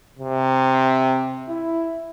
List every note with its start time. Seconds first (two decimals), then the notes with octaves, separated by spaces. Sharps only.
0.19 C3
1.49 E4